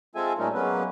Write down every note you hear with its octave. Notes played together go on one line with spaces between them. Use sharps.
G#3 C4 F4 A4 E5 G#5
A#2 G3 A3 C#4 D#4 A#4
F#3 G#3 A#3 B3 C#4 B4